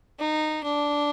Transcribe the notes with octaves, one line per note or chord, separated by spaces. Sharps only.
D#4
D4